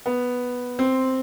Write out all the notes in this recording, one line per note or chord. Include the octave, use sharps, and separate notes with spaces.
B3
C4